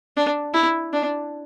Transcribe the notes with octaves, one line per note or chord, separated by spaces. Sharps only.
D4
E4
D4